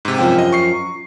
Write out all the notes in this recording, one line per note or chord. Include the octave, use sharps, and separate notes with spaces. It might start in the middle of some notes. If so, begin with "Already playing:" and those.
G#2 C3
F#2 F3 G5
D#5
C#6 C7